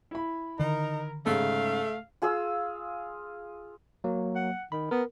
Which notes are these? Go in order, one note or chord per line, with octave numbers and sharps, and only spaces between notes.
E4 B5
D3 D#3 D#4 A#4
G#2 C#3 A3 F5
F4 G#4 F5 E6
F#3 A#3
F#5
D#3 B5
B3 A#4